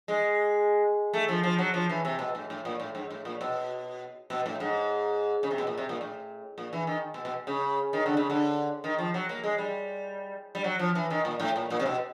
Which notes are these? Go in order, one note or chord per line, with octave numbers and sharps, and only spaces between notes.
G#3
A3
F3
F3
F#3
F3
E3
C3
B2
A2
A2
A#2
A2
G#2
A2
A#2
B2
B2
A2
G#2
C#3
C3
B2
A#2
C3
A#2
A2
A#2
E3
D#3
B2
B2
C#3
D#3
D3
C#3
D3
D#3
F3
F#3
A#3
G#3
G3
G3
F#3
F3
E3
D#3
A#2
A2
A#2
A#2
C3
B2